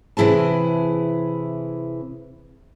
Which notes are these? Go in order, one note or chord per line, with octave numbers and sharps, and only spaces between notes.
C3 E3 E4 G#4 A5